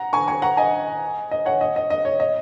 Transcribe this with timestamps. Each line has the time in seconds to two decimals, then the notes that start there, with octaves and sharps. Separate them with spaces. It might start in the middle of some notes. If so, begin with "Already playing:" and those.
Already playing: F#5 A#5
0.13 G#5 C#6
0.28 G#5 C#6
0.42 F#5 A#5
0.57 D#5 G#5
1.31 D#5
1.46 C#5 F#5
1.61 D#5
1.76 D#5
1.90 D#5
2.05 C#5
2.20 D#5